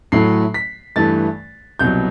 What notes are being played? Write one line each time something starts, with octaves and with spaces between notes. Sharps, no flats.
A2 F#3 A3 C7
B6
G2 E3 A3 A6
C2 B2 F#3 G6